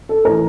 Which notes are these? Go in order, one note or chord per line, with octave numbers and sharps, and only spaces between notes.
A4
A2 E3 A#4